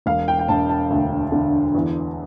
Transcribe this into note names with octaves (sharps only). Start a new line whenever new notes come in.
E1 F5
G5
G5
E1 A5
A5
D2
D3
E2